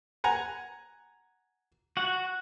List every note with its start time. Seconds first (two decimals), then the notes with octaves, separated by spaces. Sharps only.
0.24 F#5 G#5 A#5
1.97 F#4 F#5